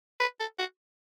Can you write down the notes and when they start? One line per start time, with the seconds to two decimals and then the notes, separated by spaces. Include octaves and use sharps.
0.20 B4
0.40 A4
0.59 F#4